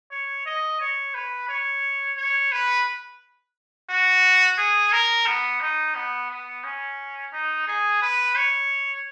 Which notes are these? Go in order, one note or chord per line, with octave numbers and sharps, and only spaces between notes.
C#5
D#5
C#5
B4
C#5
C#5
B4
F#4
G#4
A#4
B3
D#4
B3
B3
C#4
D#4
G#4
B4
C#5